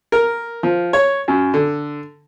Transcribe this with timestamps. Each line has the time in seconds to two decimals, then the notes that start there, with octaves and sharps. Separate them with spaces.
0.12 A#4
0.63 F3
0.93 C#5
1.28 F#2
1.54 D3